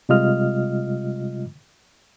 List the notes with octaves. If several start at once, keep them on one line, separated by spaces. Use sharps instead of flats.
C3 G3 G#3 F4 D#5 F6